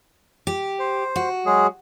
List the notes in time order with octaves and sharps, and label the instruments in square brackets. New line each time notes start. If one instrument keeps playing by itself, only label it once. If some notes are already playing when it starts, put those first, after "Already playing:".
[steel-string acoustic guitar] G4
[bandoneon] C5
[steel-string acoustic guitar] F#4
[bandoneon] F#3 G#3 G#4